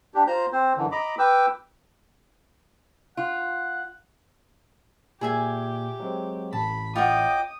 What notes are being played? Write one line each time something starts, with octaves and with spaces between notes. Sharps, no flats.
D4 G4
F4 C5 A#5 G6
C4 C5
F#2 D3 E3
D#5 A#5 B5 D6
B4 G5 D6 E6
F4 F#5
A#2 G4 G#4 E5 G#5
F#3 G#3 C4
A1 A5 B5
F4 C#5 D#5 F#5 G5 D6 D#6